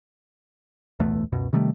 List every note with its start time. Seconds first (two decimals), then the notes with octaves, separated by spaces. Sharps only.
1.00 D1 B1 E2 A3
1.32 C#2 F#2 B2
1.53 C3 D#3 G3 A3